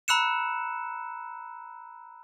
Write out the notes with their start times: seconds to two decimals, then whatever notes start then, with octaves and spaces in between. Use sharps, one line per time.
0.08 A#5 B5 E6 F#6 C#7 E7